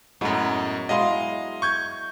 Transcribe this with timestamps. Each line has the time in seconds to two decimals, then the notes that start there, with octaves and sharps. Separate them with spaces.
0.21 F#2 A2 F#3 G#3 B3
0.89 F#3 G#3 E4 D#5 F5 C6
1.62 C#6 G6 G#6